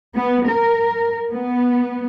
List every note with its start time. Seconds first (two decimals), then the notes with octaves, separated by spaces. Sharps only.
0.16 B3
0.50 A#4
1.32 B3